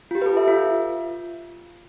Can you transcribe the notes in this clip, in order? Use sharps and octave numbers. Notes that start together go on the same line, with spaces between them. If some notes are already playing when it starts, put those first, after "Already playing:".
F4
G4
B4
A4
E5
F4